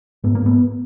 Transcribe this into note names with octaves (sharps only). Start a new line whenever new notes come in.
G#2 B3
A#3
G#2 B3